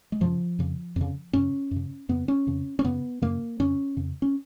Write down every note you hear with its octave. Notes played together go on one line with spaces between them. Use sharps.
G#3
F#2 C#3 F3
F2 C#3
F2 C#3
F#2 C#3 C#4
F#2 C#3
F2 C#3 B3
C#4
F2 C#3
C#4
F#2 C#3 B3
F#2 C#3 A#3
F2 C#3 C#4
F2 C#3
C#4